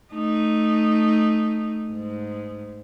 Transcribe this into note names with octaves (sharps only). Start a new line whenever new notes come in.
A3 D#4
G#2